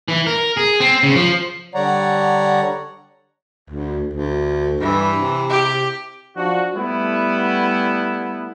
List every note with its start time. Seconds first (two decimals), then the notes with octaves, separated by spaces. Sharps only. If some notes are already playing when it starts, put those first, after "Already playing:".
0.08 E3
0.27 A#4
0.57 G#4
0.80 C4
1.03 C#3
1.16 F3
1.75 D3 G3 C#5 D5 F#5 A#5
3.70 D2
4.14 D2
4.81 G2 E3
5.20 C3
5.50 G4
6.36 F3 D4 F#4
6.75 G3 A3 B3 E4